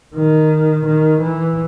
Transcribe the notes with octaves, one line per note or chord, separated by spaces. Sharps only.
D#3
D#3
E3